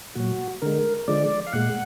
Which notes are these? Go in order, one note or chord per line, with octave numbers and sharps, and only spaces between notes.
A#2 F#3 F#4
D3 G#3 A#4
D3 F3 G#3 D5
F5
A#2 G#3 F#5